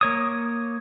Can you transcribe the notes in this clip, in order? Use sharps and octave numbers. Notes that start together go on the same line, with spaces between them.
A#3 C#5 D#6